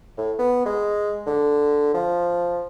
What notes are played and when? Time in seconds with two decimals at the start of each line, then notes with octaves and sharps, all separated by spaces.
0.17 A2
0.39 B3
0.66 G#3
1.26 D3
1.94 F3